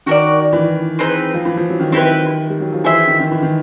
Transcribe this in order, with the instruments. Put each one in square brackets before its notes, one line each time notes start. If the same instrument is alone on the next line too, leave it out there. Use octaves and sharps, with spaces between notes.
[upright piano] D#3 [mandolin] F#4 A#4 D5
[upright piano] E3
[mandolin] C4 D#4 G#4 B4
[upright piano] F3
E3
F3
F#3
D#3
[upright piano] D#3 [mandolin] C4 E4 G4 B4
[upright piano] G3
F#3
F3
[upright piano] E3 [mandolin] G#4 C5 E5
[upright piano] D#3
D#3
E3
D#3